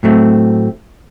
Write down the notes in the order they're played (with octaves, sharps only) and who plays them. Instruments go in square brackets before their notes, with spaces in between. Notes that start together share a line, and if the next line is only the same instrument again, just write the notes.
[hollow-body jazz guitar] A2 F#3 A3 C4